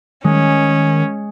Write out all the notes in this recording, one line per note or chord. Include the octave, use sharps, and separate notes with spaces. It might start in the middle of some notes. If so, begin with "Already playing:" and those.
D#3 G#3 C#4